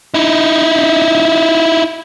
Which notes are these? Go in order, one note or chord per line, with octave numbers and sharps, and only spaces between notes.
D#4 E4